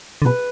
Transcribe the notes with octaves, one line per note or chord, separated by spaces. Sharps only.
D3
B2 B4